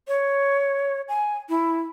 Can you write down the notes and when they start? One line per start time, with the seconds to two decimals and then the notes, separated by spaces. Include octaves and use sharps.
0.08 C#5
1.08 G#5
1.49 E4